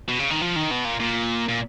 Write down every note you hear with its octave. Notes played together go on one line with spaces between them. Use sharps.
B2
C#3
D#3
F3
D#3
B2
A#2
A#2
A#2